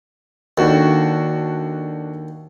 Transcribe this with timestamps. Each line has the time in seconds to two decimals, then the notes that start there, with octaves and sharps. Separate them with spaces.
0.58 D#2 D4 F#4 A4